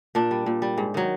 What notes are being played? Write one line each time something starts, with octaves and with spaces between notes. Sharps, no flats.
A#2 D4
G3
A#2
G3
G#2
D#3 F#3